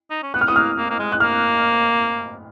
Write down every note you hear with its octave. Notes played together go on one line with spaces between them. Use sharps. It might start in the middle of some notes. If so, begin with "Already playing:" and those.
D#4
C#4
B3 F#6
F6
B3 D#6
A#3 F6
A#3
A#3
G#3
F#6
A#3 F6